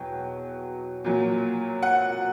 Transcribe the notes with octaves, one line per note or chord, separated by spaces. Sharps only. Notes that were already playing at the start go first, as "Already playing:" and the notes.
Already playing: E2 B2 F#3 G5
A#2 F#3
F#5